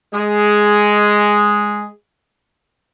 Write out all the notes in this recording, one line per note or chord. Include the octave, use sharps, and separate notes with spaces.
G#3 G#4